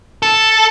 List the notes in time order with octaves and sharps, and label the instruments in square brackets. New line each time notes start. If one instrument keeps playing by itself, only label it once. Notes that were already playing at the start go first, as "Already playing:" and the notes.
[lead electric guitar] A4